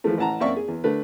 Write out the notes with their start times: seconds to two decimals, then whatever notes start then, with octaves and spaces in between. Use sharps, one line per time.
0.04 E3 F3 G#3 A3
0.17 A1 F#5 A5 A#5
0.40 F#2 A#3 C4 D5 E5 C#6
0.56 G#4
0.68 E2
0.84 D3 A3 B4